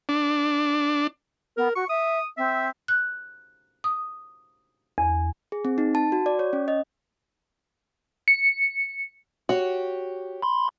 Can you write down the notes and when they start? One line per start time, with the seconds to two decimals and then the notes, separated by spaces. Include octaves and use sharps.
0.09 D4
1.57 B3 A#4
1.75 F#4 C#6
1.89 E5 D#6
2.37 C4 E5
2.88 F#6
3.84 D#6
4.98 E2
5.52 G#4
5.65 C4
5.78 D#4
5.95 A5
6.12 F#4
6.26 D5
6.39 C#5
6.53 C#4
6.68 D#5
8.28 C#7
9.49 F#4 G4 C#5
10.42 B5 C6